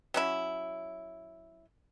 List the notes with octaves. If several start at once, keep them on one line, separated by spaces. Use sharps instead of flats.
F#3 C#4 E4